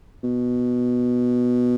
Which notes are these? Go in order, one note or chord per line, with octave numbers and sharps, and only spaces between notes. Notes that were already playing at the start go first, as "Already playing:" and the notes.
B2